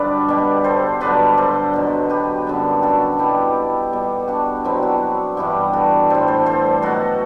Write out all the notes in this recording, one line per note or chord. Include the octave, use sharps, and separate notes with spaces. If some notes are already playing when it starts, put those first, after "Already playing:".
Already playing: G2 D3 F#3 G4 B4 D5
B2 G3
A4 C5
G2 D3 F#3 B4 D5
A4 C5
B2 F#3
G4 B4
F#2 D3 G3
F#4 A4
B2 G3 E4 G4
B2 G3
D4 F#4
B2 F#3 C4 E4
D4 F#4
G2 E3 G3 E4 G4
F#4 A4
A2 G3 A4 C5
A4 C5
A4 C5
B2 F#3 F#4 A4